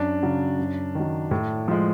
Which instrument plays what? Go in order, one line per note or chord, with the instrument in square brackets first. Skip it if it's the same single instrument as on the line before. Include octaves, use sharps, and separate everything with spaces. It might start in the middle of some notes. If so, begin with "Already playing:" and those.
Already playing: [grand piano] F#2 D4
C#3 F#3
F#2
D#3 F#3
A2
F3 G#3